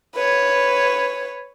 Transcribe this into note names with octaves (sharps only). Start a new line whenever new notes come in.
B4 C#5